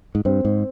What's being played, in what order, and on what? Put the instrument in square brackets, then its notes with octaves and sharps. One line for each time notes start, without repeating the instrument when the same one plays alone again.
[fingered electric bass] G#2
[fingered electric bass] G2 [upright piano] C4
[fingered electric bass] G#2